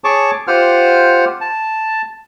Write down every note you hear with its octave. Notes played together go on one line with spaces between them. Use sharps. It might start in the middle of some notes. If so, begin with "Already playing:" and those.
G#4 C#5 A5 C#6 D6
F4 G4 C5 F#5 F6
A5